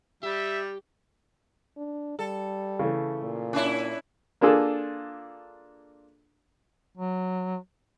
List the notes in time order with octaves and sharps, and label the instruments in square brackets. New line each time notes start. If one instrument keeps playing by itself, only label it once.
[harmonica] G3 [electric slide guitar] G4 [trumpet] E5
[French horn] D4
[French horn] G3 [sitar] A4
[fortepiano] C#3 E3 A3
[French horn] A#2
[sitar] C#4 D4 E4
[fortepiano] A#3 D4 F4 G#4 A4
[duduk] F#3